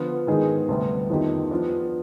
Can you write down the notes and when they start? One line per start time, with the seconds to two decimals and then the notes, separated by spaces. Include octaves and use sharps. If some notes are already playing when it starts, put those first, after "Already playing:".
Already playing: D3 F3 B3 F4
0.27 G#2 D#3 B3 D#4 G#4
0.69 D2 C3 G3 B3
1.09 F2 D#3 B3 D#4 G4
1.51 F3 B3 D4